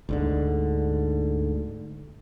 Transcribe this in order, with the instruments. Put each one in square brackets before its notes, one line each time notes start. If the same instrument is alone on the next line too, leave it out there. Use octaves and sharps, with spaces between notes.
[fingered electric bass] D2 G#2 D3